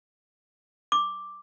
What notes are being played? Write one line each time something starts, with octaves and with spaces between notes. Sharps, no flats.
D6